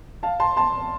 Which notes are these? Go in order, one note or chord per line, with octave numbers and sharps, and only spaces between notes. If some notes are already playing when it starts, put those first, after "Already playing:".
F5 A5
A5 C6
A5 C6